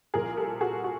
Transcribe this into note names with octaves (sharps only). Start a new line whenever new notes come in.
C2 A#2 F3 G#4 A#4
G4 A4
F#4 G#4
F#4